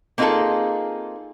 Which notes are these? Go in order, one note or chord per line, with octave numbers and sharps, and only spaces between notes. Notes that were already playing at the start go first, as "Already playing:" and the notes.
A#3 C4 D#4 F4 G#4 A4